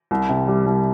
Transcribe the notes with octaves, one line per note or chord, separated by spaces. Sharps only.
C2
C3
G3
C2